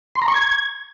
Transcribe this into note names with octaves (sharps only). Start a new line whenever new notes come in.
C6
A#5
C#6
G#6